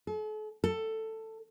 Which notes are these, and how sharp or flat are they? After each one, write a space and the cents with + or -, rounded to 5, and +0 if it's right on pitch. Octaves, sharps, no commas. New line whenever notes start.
A4 -45
A4 +10